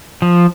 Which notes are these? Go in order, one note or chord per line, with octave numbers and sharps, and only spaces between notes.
F3